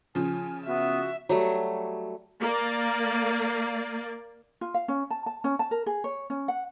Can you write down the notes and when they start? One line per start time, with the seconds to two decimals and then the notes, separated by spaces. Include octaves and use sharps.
0.15 C#3 F3 G#5
0.66 B3 F#4 E5
1.29 F#3 G3 A3
2.39 A#3 D5
4.61 F4
4.74 F5
4.88 C#4
5.10 A5
5.26 A5
5.44 C#4
5.59 A5
5.71 A#4
5.86 G#4
6.04 C#5
6.30 C#4
6.48 F#5